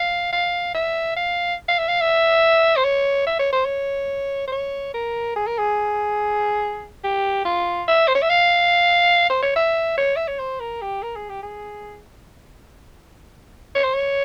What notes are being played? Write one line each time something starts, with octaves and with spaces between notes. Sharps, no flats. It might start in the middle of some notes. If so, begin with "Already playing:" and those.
Already playing: F5
F5
E5
F5
F5
E5
F5
E5
C5
C#5
E5
C#5
C5
C#5
C5
C#5
A#4
G#4
A#4
G#4
G4
F4
E5
C5
C#5
E5
F5
C5
C#5
E5
C#5
E5
C#5
C5
A#4
G4
A#4
G#4
G4
G#4
C#5
C5
C#5